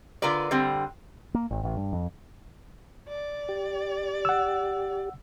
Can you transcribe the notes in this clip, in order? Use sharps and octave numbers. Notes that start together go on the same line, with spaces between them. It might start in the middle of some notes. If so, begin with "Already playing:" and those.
D3 F4 A#4 B4 D5
D3 G3 C4
A#3
G#1
A1
G2
F2
D5
G4
F#5 E6